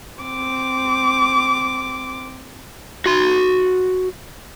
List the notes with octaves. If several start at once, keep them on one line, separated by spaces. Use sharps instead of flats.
C4 D6
F#4 C6